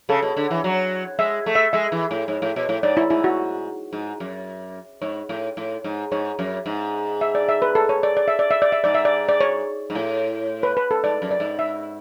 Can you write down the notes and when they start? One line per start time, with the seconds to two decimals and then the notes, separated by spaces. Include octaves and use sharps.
0.09 C#3 A4
0.23 B2
0.37 D3
0.51 E3
0.64 F#3
1.19 G#3 E5
1.46 A3
1.55 E5
1.73 G#3 E5
1.92 E3
2.11 A2
2.28 G#2
2.42 A2
2.56 B2
2.69 A2
2.83 G#2 D5
2.97 E4
3.10 G#2 E4
3.24 F#4
3.93 G#2
4.20 F#2
5.02 G#2 C#5
5.29 A2
5.57 A2
5.84 G#2
6.12 G#2 C#5
6.39 F#2
6.66 G#2
7.21 E5
7.35 D5
7.49 E5
7.62 B4
7.75 A4
7.89 C#5
8.03 D5
8.17 D5
8.28 E5
8.39 D5
8.51 E5
8.62 D5
8.72 E5
8.84 G#2 D5
8.95 E5
9.05 D5
9.29 D5
9.41 C#5
9.90 G#2
9.95 A2
10.63 B4
10.77 B4
10.91 A4
11.04 G#2 D5
11.22 F#2
11.31 D5
11.40 G#2
11.59 E5